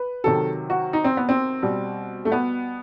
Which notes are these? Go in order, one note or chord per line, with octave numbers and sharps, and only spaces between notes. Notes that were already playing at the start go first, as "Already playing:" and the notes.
Already playing: B4
C3 D#3 F#3 A4
F#4
D#4
C4
B3
C4
B2 G3
A3
B3